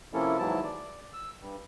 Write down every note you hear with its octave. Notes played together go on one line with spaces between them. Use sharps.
C3 F3 A#3 C#4 E4 A4
D#2 G#2 E3 F#3 E4 A5
D5
E6
G2